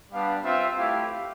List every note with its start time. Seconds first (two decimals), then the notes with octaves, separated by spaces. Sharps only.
0.12 G3 B3 D4 F5
0.44 C4 F4 E5
0.77 A3 E4 G4 F5